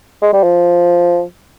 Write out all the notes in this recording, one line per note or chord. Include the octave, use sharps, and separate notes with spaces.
G#3
G3
F3